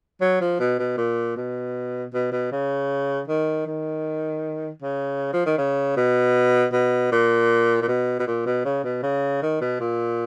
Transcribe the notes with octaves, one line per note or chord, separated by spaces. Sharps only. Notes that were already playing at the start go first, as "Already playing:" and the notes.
F#3
F3
B2
B2
A#2
B2
B2
B2
C#3
D#3
D#3
C#3
F3
D#3
C#3
B2
B2
A#2
A#2
B2
B2
A#2
B2
C#3
B2
C#3
D#3
B2
A#2